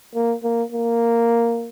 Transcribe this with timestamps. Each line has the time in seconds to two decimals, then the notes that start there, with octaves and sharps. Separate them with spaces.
0.15 A#3
0.43 A#3
0.72 A#3